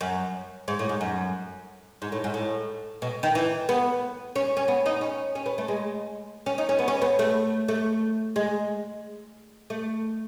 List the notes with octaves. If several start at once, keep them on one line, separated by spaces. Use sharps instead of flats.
F#2
G#2
A2
G#2
F#2
G#2
A2
G#2
A2
B2
D#3
E3
B3
C#4
C#4
B3
D#4
C#4
C#4
B3
A3
G#3
C#4
D#4
C#4
B3
C#4
B3
A3
A3
G#3
A3